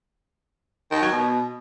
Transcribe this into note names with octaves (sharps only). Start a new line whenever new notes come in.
D#3
F#3
B2